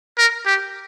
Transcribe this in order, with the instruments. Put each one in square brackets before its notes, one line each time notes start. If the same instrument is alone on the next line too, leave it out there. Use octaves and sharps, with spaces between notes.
[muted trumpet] A#4
G4